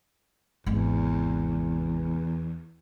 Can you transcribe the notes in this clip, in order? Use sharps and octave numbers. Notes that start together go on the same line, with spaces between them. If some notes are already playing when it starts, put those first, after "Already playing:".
G#1 E2 C3